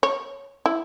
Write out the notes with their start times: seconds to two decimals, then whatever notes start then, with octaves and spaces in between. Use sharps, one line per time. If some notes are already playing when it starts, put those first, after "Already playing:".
0.03 C#5
0.66 E4